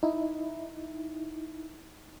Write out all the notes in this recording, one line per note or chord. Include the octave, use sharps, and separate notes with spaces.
D#4 E4